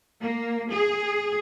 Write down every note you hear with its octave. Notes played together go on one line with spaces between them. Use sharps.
A#3
G#4